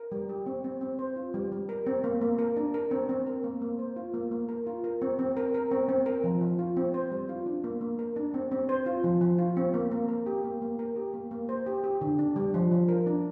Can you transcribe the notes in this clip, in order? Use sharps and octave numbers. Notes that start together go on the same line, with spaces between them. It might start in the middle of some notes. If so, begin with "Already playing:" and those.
Already playing: A#4
G3
G4
C4
C4
C4
C5
F4
G3
G3
A#4
C4
A#3
A#3
A#4
D4
A#4
C4
C4
A#4
A#3
A#3
C5
F4
A#3
A#3
A#4
F4
A#4
C4
C4
A#4
A#4
C4
C4
A#4
F3
F3
F4
C4
C5
G3
F4
D4
A#3
A#3
A#4
D4
C4
C4
C5
F4
F3
F3
F4
C4
A#3
A#3
A#4
G4
A#3
A#3
A#4
G4
A#3
A#3
C5
G4
G4
D3
D4
G3
F3
F3
A#4
D4